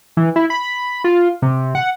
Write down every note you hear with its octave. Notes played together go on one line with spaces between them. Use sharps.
E3
E4
B5
F4
C3
F#5